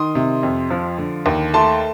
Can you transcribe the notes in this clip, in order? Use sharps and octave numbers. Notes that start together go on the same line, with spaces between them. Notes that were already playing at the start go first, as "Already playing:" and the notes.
Already playing: D#3 C6 D#6
C3
F2
F3
D3
D#2
A3 A5 C6